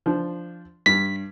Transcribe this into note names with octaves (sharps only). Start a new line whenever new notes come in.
F3 D4
G2 D4 B6